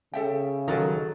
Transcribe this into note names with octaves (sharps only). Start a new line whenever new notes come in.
C#3 A4 E5 G5
D#3 F#3 A4 A#4 A6